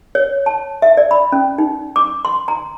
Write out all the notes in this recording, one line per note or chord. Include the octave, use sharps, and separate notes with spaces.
C#5
A5
E5
D5
B5
C#4
D#4
D6
C6
A#5